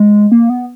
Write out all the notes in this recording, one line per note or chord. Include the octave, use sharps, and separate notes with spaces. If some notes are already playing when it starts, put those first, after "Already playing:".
Already playing: G#3
A#3
B3